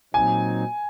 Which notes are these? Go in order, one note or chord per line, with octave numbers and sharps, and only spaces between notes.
A#2 F#3 C4 D#4 G#5